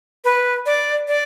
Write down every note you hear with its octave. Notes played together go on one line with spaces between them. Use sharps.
B4
D5
D5